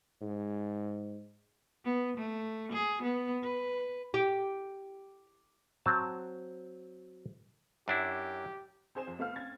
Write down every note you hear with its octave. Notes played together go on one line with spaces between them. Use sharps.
G#2
B3
A3
G#4
B3
B4
G4
F#3 C4 A5
F#2 D4 E4 G4
C4 G#4 C5 G#5 E7
F2
A3 B3 C4 F5 F6
C4 C#4 G#6 A6